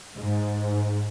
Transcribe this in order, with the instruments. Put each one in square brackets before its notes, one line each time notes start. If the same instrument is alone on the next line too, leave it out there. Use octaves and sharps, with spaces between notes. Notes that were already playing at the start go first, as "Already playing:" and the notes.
[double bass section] G#2